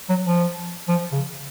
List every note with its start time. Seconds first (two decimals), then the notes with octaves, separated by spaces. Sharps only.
0.09 F#3
0.25 F3
0.89 F3
1.12 C#3